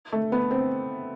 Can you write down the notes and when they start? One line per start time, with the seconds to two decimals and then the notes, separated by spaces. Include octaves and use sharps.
0.12 A3
0.32 B3
0.51 C4